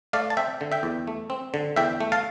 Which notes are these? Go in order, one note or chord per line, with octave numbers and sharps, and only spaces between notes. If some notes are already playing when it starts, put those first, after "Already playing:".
A3 D5 F5
A5
C4 E5 G5
D3
E5 G5
E2
A3
C4
D3
E2 E5 G5
A3
F5 A5